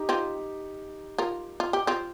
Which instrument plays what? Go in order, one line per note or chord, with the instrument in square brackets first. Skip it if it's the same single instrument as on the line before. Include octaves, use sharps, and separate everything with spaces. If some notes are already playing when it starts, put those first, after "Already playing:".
Already playing: [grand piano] D#4 G4
[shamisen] C4 F4
F4 A#4
F4
G4
C4 F4